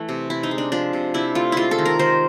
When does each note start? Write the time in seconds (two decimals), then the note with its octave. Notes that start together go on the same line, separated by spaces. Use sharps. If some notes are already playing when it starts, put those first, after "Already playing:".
Already playing: E3 A3
0.09 C3
0.30 C3 E4
0.43 D#4
0.51 G#3
0.58 D4
0.72 F3 D4
0.93 C3
1.14 C3 E4
1.35 A3 F4
1.52 G#3 E4 F4
1.71 A4
1.79 D#3
1.85 A#4
1.99 D#3 C5